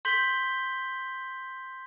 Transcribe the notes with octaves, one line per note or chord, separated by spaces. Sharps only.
C6 G6 B6 F#7 G7